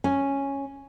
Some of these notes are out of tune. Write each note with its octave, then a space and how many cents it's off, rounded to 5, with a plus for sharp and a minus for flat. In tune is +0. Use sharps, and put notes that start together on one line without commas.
C#4 -5 G#5 +0